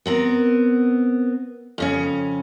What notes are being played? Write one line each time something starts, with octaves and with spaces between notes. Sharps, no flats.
B3 C4 A#4
F2 C#3 C#4